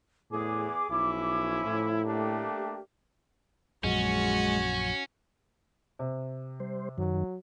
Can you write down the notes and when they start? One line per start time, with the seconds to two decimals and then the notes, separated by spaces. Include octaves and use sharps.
0.31 E2 A2 G#4 D6
0.90 B1 F3 C#4 E4
1.65 A2
2.04 A3 A#3 D4 G4
3.84 A#1 F#2 G#3 C#4 F#4
5.99 C3
6.60 G3 C5
6.98 F#2 D#3 F#3